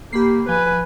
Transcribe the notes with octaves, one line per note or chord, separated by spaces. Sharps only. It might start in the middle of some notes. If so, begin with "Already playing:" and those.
A#3 G4 B5 C7
F3 B4 G#5